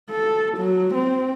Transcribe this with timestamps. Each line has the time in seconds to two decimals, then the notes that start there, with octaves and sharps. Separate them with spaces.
0.10 A4
0.57 F#3
0.94 C4